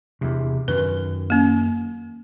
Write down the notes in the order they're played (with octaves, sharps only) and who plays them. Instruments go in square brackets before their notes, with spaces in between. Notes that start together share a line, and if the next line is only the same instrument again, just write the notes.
[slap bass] E2 C3
[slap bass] F#2 D#3 [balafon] B4
[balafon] A#3 C#4